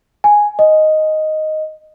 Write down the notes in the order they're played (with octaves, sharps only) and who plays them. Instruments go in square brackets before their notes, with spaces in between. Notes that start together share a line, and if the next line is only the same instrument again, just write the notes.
[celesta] G#5
D#5